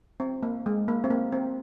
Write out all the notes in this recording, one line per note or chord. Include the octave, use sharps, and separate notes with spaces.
C4
A#3
G#3
A#3
C4
A#3
C4